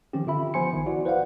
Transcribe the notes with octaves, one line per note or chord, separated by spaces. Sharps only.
D#3 F3 C4 C#4 G4
D3 F4 E5 B5
F3 B3 C5 G#5 C6 C#7
A#1 D#3
E4 F#4 D5
B4 C5 D5 F5 F#5